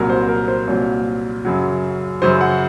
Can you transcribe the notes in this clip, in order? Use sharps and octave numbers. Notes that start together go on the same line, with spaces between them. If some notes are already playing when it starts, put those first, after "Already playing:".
Already playing: C2 A#2 F#3 A#4
C5
A#4
C5
C2 A#2 F#3 C#5
F#2 C#3 F#3
F#2 C#3 F#3 C5
F#5